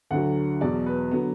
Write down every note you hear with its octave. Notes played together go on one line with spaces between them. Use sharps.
D2 D3 F#3 F#5
E2 B2 F#3 D5
B4
D3 F#3 B3